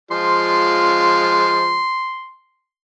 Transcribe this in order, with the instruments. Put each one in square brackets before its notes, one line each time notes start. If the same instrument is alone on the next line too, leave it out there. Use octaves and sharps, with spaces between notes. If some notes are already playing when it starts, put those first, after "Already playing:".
[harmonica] F3 G#3 F4 [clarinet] C6